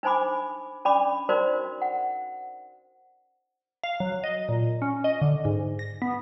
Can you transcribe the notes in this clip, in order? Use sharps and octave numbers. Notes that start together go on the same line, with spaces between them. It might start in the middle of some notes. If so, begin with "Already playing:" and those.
D4 D#4 C5 G#5 B5 D6
C#4 D4 D5 B5 D6
D#4 F#4 A#4 C5 D5
F#5
F5
F#3
D#5
A#2
C#4
D#5
D3
G#2
A#6
B3